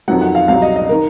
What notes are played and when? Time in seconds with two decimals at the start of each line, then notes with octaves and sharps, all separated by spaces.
0.08 F2 D#3 F#3 F#5
0.21 F#5
0.35 F5
0.48 C2 C3 F#3 F5
0.62 D#5
0.76 D#5
0.89 D#3 A#4